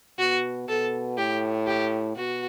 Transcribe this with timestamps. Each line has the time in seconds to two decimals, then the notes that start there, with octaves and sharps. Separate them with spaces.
0.19 B2 F#4
0.68 B2 A4
1.17 A2 G4
1.67 G4
2.17 B2 F#4